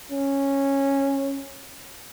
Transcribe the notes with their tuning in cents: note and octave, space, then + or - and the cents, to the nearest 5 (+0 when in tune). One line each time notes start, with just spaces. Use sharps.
C#4 -10